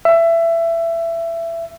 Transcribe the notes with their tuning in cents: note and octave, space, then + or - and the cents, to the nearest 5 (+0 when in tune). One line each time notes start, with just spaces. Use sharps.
E5 +20